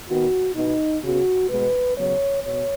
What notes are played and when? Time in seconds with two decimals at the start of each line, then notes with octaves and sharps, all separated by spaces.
0.09 D#3 B3 F#4
0.56 B2 B3 D#4
1.02 C#3 B3 F#4
1.49 B2 G#3 B3 B4
1.96 C#3 F#3 B3 C#5
2.43 B2 C#5